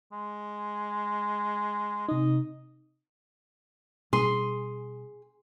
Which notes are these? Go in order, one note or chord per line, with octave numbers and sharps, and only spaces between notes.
G#3
C3 D#4 D#5
B2 G3 D4 G#4 C6